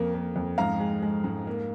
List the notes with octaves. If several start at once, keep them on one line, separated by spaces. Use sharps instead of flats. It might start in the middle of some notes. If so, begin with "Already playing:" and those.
Already playing: F2 A#3
A#3
F2
G#2 F5 A#5
G#3
G#3
G#2
A#3